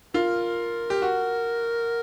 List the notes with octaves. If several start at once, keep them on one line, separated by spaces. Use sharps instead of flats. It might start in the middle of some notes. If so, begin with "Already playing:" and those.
F4 A#4
G4
F#4